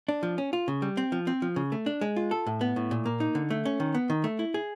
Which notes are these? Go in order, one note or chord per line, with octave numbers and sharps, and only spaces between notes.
D4
F3
C#4
F4
C#3
G3
C4
F3
C4
F3
C#3
A3
D4
G#3
F4
A4
A2
B3
A2
A#2
A#3
D#4
D3
A3
C#4
D#3
B3
D#3
A3
E4
G#4